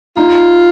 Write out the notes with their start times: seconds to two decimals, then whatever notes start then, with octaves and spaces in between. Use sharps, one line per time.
0.17 D#4 F4